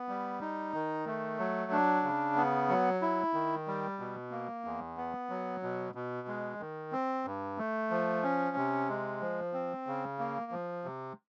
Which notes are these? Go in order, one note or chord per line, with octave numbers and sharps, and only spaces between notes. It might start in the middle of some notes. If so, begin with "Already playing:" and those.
Already playing: B3
G3
D#4
D#3
A3
F#3
D4
C#3
B3
F#3
E4
D#3
G3
B2
A#3
E2
B3
F#3
B2
B2
G#3
D#3
C4
G2
A3
F3
C#4
C3
G#3
F3
C4
C#3
A#3
F3
C3